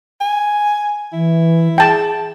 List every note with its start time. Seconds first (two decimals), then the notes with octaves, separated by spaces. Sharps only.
0.21 G#5
1.13 E3 E4
1.78 G#4 G5 A5